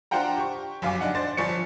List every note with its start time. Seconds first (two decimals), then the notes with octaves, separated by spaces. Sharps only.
0.11 D4 F4 C5 F#5 G5 A#5
0.37 G4 C#6
0.82 G1 F#2 F5 G#5 D6
1.01 D4 D#4 F#5
1.15 D4 C5 A6
1.37 G1 F3 D5 G#5 C#6 C#7